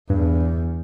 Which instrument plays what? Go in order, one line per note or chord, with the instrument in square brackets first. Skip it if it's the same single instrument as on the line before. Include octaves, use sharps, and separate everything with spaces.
[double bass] E2 [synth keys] G2